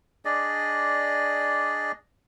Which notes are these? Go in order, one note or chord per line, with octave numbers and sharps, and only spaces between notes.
D4 G#4 D5 D#5